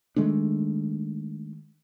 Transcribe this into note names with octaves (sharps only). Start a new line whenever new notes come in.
D#3 G#3 A3 D4